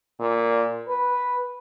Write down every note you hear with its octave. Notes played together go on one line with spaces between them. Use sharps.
A#2
B4